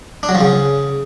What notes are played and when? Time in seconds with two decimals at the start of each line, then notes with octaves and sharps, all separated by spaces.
0.23 D4
0.29 F#3
0.35 F3
0.41 C#3